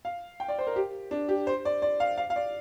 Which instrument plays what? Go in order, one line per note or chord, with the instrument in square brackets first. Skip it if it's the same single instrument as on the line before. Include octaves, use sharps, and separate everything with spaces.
[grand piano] F5
G5
D5
C5
A#4
G4
D4
G4
C5
D5
D5
F5
F5
F5
D5